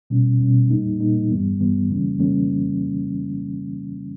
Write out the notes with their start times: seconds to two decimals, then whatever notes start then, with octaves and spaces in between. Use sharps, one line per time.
0.10 B2 G3 C#4
0.40 B2 G3 C#4
0.70 A#2 G3 A#3 D#4
1.00 A#2 G3 A#3 D#4
1.31 G2 E3 G3 B3
1.60 G2 E3 G3 B3
1.90 C#3 E3 G3 A#3 C#4
2.20 C#3 E3 G3 A#3 C#4